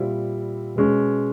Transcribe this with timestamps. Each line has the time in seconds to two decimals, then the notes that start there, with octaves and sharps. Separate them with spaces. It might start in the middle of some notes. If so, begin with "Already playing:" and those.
Already playing: A#2 G3 C4 E4
0.76 B2 G#3 C#4